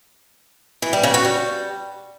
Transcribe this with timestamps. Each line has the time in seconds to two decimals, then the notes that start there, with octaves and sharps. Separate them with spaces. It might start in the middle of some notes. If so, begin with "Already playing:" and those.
0.82 E3
0.93 G3
1.03 C#3
1.14 F#4
1.24 G3